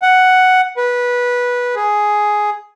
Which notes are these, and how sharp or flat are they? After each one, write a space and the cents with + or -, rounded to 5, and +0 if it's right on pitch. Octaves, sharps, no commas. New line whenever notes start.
F#5 +5
B4 -15
G#4 +5